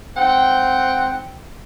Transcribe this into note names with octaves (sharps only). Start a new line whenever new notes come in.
G#2 C4 F#5 G5